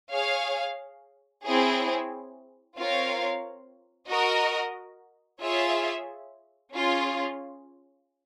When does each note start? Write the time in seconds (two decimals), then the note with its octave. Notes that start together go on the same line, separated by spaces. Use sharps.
0.13 G#4 C#5 F5
1.46 C4 E4 G#4 C#5
2.77 C4 F4 A#4 C#5 F5
4.09 F#4 A#4 D#5
5.41 F4 G#4 C#5 E5
6.74 C#4 F4 G#4